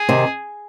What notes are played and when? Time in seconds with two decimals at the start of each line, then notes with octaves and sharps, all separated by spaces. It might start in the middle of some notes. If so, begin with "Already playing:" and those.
Already playing: G#4
0.09 C3 D#3